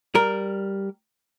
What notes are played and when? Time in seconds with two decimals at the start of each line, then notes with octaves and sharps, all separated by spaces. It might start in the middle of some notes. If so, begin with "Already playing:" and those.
0.15 G3 A#4